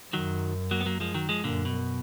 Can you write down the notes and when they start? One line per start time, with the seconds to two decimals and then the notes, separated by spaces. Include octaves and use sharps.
0.13 F#2 D#3 F#3
0.71 F#3 A#3
0.81 B3
0.86 F#3 A#3
1.00 F3 G#3
1.14 D#3 F#3
1.29 F3 G#3
1.44 F#2 A#2 D3
1.65 B2